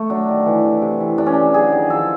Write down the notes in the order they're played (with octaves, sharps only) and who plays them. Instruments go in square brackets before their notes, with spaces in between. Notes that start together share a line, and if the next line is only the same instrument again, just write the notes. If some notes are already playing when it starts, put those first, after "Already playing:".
Already playing: [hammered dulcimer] A3
F#3 D4
D#3
E3
C3
C3
E3
C3 D4
C#4
C3 D4
F#3 G#4
D#3
F3 A4